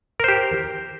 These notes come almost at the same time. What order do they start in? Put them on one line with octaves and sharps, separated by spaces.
A#4 C5 G4